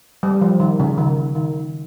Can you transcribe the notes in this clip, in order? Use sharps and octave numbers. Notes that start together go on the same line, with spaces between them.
G3
F3
D#3
C#3
D#3
D#3